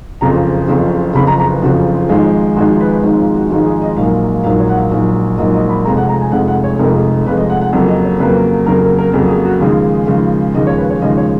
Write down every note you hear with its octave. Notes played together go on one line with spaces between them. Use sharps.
F#1 F2 C#3 F3 A#5
F#1 F2 C#3 F3
F#1 F2 C#3 F3 B5
A#5
A#5
B4
F#1 F2 C#3 F3 F#4
F4
F4
G#1 G#2 F3 G#3
G#1 G#2 F3 G#3 F#4
B4
B4
G#1 G#2 F3 G#3
F4
F#4
G#1 G#2 F3 G#3 F#4
G#4
D#5
A#1 G#2 F#3 A#3 F5
F5
F5
A#1 G#2 F#3 A#3 F5
C#5
F#5
F5
A#1 G#2 F#3 A#3
A#1 G#2 F#3 A#3 D#5
D#5
B5
F1 F2 F3 G#3 A#5
F#5
A#5
G#5
F1 F2 F3 G#3 F#5
F#5
C#5
F1 F2 F3 G#3 A#4
G#4
F1 F2 F3 G#3 B4
D#5
F#5
F#5
F2 C#3 F#3 A#3 F#5
D#5
C#5
F2 C#3 F#3 A#3 B4
F2 C#3 F#3 A#3 A#4
A#4
A#4
F2 C#3 F#3 A#3 G#4
G#4
F#4
D#2 C#3 F3 G#3 G#4
D#2 C#3 F3 G#3
D#2 C#3 F3 G#3 D#5
C#5
B4
C#5
D#2 C#3 F3 G#3 D#5
C#5